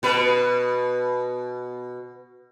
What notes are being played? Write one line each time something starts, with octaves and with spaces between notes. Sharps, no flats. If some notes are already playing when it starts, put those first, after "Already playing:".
B2 B4